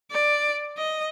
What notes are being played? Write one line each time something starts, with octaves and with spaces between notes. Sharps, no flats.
D5
D#5